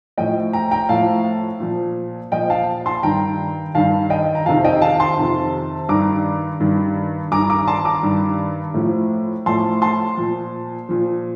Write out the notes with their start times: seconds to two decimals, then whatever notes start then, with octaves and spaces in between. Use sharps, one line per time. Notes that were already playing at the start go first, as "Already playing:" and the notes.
0.17 A2 F3 D#5 G5
0.53 G5 A#5
0.71 G5 A#5
0.89 A2 F3 F5 A5
1.60 A#2 F3
2.32 A#2 F3 D#5 G5
2.50 F5 A5
2.86 A5 C6
3.03 G2 D#3 G5 A#5
3.75 G2 D#3 F5 A5
4.10 D#5 G5
4.35 A#5
4.46 F2 C3 D#3 F5 A5
4.64 D#5 G5
4.82 F5 A5
5.00 A5 C6
5.18 F2 C3 D#3
5.89 G2 D#3 A#5 D6
6.60 G2 D#3
7.32 G2 D#3 A#5 D6
7.50 A#5 D6
7.68 A5 C6
7.85 A#5 D6
8.03 G2 D#3
8.74 A2 F3
9.46 A2 F3 A5 C6
9.82 A5 C6
10.17 A#2 F3
10.89 A#2 F3